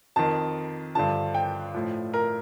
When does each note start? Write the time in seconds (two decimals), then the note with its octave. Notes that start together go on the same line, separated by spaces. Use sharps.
0.16 F2 D#3 A5
0.95 G2 D3 F3 A5
1.35 G5
1.75 A2 F3
2.14 A#4